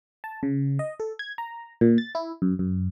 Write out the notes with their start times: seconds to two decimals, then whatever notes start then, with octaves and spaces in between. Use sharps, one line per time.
0.24 A5
0.43 C#3
0.79 D#5
1.00 A4
1.19 G#6
1.38 A#5
1.81 A#2
1.98 A6
2.15 E4
2.42 F#2
2.59 F#2